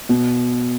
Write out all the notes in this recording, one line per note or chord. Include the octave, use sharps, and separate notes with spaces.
B2